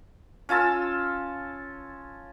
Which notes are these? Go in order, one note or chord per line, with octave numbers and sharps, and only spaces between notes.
C#4 F4 A5 E6